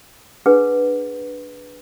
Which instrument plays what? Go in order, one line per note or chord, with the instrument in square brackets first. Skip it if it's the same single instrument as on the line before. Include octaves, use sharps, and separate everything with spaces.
[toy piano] D4 G#4 B4 F#5